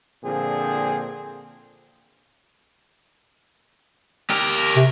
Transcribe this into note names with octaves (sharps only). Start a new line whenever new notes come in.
A#2 D3 F3 C4 G#4
G4 A#4
C3